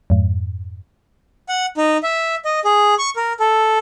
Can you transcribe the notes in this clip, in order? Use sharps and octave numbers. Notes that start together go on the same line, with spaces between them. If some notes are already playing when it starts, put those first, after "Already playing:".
F2 G#2
F#5
D#4
E5
D#5
G#4
C#6
A#4
A4